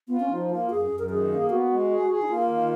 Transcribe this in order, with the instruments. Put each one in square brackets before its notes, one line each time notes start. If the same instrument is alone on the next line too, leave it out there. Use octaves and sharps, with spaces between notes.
[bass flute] B3 [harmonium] F4
[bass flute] C#4
[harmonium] F3 [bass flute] D#4
[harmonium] A#3 [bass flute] F4
[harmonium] F#2 [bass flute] G#4
[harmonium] F#2
[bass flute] A#4
[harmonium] D#3 [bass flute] G#4
[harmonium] A#3
[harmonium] B3 [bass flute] F#4
[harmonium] G#3
G#4
G#4
[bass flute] D#4
[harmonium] A#3 [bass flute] F4
[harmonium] D#3